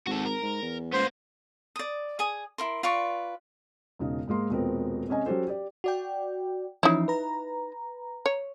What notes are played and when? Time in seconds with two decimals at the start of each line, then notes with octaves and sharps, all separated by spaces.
0.07 G#1 F#4 A4
0.26 A#4
0.42 G#2
0.62 E2
0.93 C#2 A#3 B3 C5
1.76 D5 D#6
2.19 G#4 G#5 D#6
2.58 E4 A#4 C6
2.83 F4 B4 D5 C#6
3.99 E1 C#3 D#4
4.27 G#2 G#3 A#3 C6
4.50 D#1 B2 G#3 B3 C4 A#4
5.08 C3 G#3 C#4 D#5 G#5
5.26 F#3 C#4 F#4 G4 A4 C5
5.47 G4 D5
5.84 F#4 D5 G5
6.83 E3 F3 C#4 D#4 E4
7.08 B4 A#5
8.26 C#5